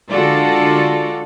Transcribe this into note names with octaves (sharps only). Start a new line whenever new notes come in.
D3 G#3 F4 F#4 A4 D5